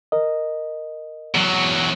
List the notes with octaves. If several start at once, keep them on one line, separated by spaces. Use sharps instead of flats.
A#4 D#5
E2 F#3